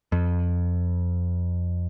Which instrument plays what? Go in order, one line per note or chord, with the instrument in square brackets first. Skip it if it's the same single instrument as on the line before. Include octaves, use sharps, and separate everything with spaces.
[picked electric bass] F2